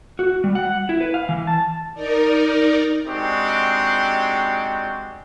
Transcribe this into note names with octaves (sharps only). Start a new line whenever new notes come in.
F#4
G3
F#5
E4
B4
F5
E3
A5
D#4 A#4 D5
G#3 C4 D4 D#4 F#4 G4